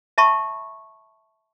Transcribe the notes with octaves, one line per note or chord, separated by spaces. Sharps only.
E5 A5 B5 C#6